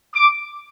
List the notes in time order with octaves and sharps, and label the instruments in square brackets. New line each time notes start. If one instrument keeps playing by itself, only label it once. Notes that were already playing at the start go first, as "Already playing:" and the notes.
[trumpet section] D6